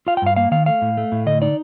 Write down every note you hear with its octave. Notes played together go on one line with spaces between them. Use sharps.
F4 F5
G5
G2 F5
A#3 F5
D#3 F5
A3 F5
A2
A3
A2
D3 D#5
D#4 D5